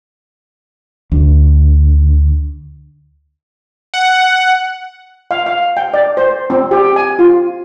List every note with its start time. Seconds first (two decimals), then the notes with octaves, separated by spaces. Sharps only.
1.12 D2
3.94 F#5
5.31 F5
5.46 F5
5.77 G5
5.94 D5
6.17 C5
6.50 C4
6.71 G4
6.96 G#5
7.19 F4